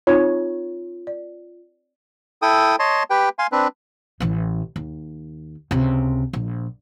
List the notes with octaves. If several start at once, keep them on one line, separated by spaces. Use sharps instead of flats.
C4 D#4 F4 C#5
D5
E4 A4 G5 D#6
C#5 D#5 A5 C6
G4 B4 G5
F5 G#5 C6
C4 D4 B4
A1 E3
D#2
C#2 C3
A#1